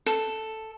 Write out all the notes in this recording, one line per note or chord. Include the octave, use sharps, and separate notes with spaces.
A4